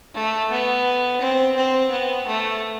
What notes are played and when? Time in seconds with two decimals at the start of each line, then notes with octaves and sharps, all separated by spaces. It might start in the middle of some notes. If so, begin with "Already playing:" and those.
0.14 A3
0.51 B3
1.21 C4
1.56 C4
1.91 B3
2.27 A3